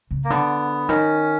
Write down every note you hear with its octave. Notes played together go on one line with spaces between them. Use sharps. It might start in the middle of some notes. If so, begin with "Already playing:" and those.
C#3
A#3
D3 B3
D#3 C#4